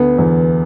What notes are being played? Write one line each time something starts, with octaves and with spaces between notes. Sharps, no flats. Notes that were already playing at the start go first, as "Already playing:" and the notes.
Already playing: D2 B3
E2